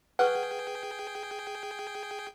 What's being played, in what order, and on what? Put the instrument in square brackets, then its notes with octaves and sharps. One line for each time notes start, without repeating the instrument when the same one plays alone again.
[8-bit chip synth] G#4 G5 [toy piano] B4 C#6 [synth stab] F#5